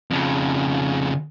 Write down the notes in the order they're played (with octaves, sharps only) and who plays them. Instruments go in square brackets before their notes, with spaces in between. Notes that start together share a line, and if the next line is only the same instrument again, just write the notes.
[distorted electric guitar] F2 C#3